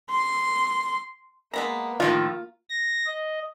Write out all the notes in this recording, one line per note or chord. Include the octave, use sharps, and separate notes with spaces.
C6
G#3 A#3 B3 A#5
A2 D#3 F3 F4 F5
A#6
D#5